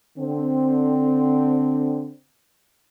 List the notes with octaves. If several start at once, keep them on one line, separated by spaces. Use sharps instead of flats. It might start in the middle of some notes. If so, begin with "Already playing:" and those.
D3 C4